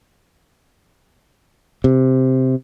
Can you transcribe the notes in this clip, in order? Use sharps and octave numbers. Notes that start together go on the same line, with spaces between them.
C3